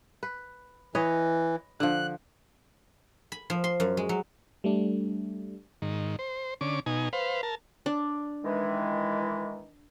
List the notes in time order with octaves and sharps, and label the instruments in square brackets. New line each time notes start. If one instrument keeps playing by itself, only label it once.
[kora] B4
[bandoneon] E3 [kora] B4 C#5 D#5
[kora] D3 F3 [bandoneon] F#6
[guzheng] B5
F3
C6
F#2
G#3
F#3
[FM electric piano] G3 A3 D4
[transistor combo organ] G#2 D#3
C5
D3 C#4 D6
B2 D#4 G#5
B4 C5 F5
A#4 A5
[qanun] D4
[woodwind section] D#3 E3 G#3